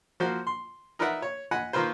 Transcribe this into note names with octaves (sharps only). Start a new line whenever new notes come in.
F3 A#3 F#4 C5
C6
D#4 A#4 B4 D5 E5 F#5
C#5
D#5 F#5 G#5 B5
D#3 A#3 F4 B4 C5